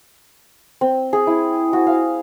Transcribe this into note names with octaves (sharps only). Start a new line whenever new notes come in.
C4
G#4
E4
F#4
F5